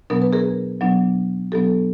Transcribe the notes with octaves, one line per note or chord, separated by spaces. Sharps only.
B2 F#3 B3 D4 A#4
B4
G#4 A#4
B2 F#3 B3 D4
B2 F#3 B3 D4 G4 A4